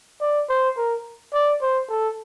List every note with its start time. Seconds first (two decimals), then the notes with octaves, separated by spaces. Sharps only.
0.21 D5
0.49 C5
0.77 A#4
1.33 D5
1.62 C5
1.89 A4